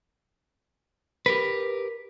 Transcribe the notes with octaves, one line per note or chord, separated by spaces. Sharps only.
G4 A#4 B4